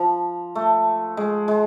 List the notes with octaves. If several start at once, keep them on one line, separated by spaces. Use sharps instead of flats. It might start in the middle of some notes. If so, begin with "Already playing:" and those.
Already playing: F3
A3
G#3
G#3